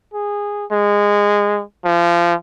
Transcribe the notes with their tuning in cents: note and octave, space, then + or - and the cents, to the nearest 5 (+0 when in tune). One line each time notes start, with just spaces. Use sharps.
G#4 -15
G#3 -20
F3 -25